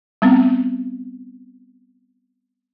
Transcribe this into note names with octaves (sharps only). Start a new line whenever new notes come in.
G3 B3 C4